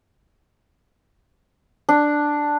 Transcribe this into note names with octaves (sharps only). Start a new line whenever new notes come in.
D4